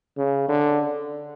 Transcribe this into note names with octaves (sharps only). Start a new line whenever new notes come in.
C#3
D3